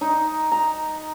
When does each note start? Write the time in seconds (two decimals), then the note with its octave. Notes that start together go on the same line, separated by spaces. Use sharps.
0.01 D#4
0.51 A#5